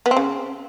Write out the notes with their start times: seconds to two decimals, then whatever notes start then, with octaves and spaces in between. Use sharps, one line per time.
0.06 B3
0.11 C4
0.17 C#3